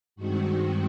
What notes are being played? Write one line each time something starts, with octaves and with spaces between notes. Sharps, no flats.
G2 D#3 G#3 C4 F#4